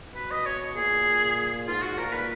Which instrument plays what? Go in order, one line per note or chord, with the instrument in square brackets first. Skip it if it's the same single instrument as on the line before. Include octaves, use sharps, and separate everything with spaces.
[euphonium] B2 [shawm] B4
[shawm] D#5
C#5
[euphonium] A#2 [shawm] G#4
[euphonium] G#2 [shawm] F4
[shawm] F#4
[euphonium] A#2 [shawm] A#4
[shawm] B4